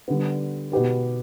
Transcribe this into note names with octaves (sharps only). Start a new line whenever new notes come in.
D3 G3 B3
B2 B3 G4 B4